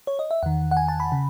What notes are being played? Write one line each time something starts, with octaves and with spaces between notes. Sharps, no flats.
C#5
D#5
E5
E2 D#3 F#5
F#5
G#5
A5
B5
C#3